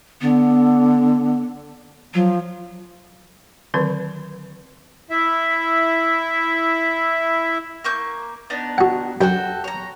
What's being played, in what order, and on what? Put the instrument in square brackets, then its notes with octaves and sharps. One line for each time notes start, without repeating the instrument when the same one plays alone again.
[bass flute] D3 [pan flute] B3
[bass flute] F3 [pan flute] F#3
[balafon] D3 D#3 F#3 C4 B4
[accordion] E4 E5
[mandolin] A#3 C#6 G6
B3 D4 D#4
[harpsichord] F#4 F#5
[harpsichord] F#2 [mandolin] F#4 A4 G5
[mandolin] C#5 A#5